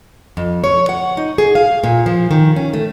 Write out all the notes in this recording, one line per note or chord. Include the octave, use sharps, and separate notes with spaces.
F2
C#5
F#5
D#4
G#4
F5
A#2
F3
D#3
C#4
A3